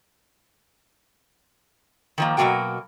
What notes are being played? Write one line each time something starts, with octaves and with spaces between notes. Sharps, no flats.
D#3 F3 A#3
B2 F#3 G3 A#3 F#4 G5